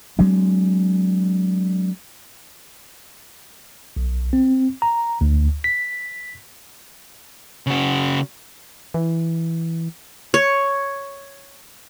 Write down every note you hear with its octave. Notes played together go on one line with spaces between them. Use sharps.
F#3 G#3 C4 D4
B1
C4
A#5
D2
B6
C#3 F#4
E3
C#5